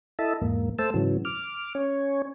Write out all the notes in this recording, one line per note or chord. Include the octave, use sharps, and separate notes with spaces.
E4 A4 D#5 E5 A5
E2 G#2 A#3
A3 C5 A5 E6
G#2 C#3 E3 F#3
D6 F6
C#4 C#5